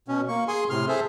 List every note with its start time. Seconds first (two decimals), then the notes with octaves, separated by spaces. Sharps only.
0.08 B2 C#4
0.28 A#3 C#6
0.48 G#4 G#5 C6
0.70 A2 C3 C6 F6
0.88 G#4 A4 C5 E5